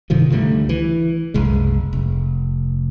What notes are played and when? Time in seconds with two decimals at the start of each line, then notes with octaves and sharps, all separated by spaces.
0.10 G2 C3 D#3 F3
0.31 C#2 D3 G3 A3
0.69 E3
1.34 F#1 C2 G#3
1.93 F1